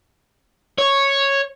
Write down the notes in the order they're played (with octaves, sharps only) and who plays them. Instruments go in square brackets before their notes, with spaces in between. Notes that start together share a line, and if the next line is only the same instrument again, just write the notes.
[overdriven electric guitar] C#5